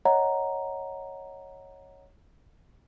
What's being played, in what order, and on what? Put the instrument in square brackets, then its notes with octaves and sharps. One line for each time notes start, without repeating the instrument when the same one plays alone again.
[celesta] C#5 D#5 F#5 A#5